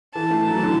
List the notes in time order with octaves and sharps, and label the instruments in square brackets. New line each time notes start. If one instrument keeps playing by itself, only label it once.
[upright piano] E3 [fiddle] A5
[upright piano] A3
F#3
E3
D3